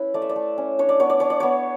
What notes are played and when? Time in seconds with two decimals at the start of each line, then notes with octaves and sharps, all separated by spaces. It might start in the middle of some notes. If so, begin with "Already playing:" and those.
Already playing: C#4 E4 B4
0.14 A3 D5
0.22 E5
0.29 D5
0.36 A3
0.58 C#4
0.79 D4 C#5
0.89 D5
1.00 B3 C#5
1.10 D5
1.20 D4 C#5
1.30 D5
1.40 B3 C#5